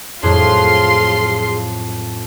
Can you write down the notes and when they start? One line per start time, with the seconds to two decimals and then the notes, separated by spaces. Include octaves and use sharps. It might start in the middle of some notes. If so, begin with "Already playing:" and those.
0.23 F2 A2 F#3 F4 G#4 C6